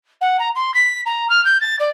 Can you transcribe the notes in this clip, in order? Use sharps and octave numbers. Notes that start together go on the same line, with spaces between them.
F#5
A#5
C6
B6
A#5
F6
G6
A6
D5